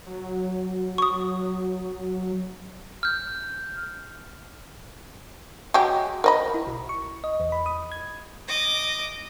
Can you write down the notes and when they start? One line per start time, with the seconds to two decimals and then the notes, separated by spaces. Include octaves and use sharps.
0.06 F#3
0.98 C#6 D#6
3.03 F6 G6
5.74 F#3 G#3 G4
6.24 A#4 D#5 B5
6.54 E4
6.67 B1
6.89 C#6
7.24 D#5
7.40 E2
7.52 B5
7.66 D#6
7.92 G#6
8.48 D#5 D6